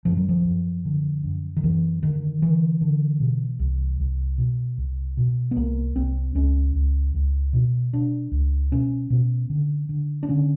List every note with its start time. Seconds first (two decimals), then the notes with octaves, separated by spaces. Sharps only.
0.05 F#2 F3
0.17 F#3
0.29 F3
0.45 F#2
0.85 D3
1.24 F#2
1.57 D#3
1.64 F#2 E3
2.02 D3 D#3
2.42 D3 E3
2.81 D3
3.20 B2
3.59 C2
4.00 C2
4.38 B2
4.78 C2
5.17 B2
5.51 B3
5.56 C2 A#3
5.96 C2 C4
6.35 C#2 C#4
6.75 C#2
7.14 C#2
7.53 B2
7.93 B2 D4
8.31 C#2
8.71 B2 C#4
9.10 B2
9.50 D3
9.89 D3
10.23 D4
10.29 D3 C#4